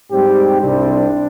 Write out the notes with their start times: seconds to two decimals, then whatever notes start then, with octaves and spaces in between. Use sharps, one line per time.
0.11 G#2 G3 C4 G4
0.61 C2 C3 G3 C4 D4